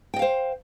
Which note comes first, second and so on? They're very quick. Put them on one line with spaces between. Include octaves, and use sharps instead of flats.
G5 D#5 F5 C5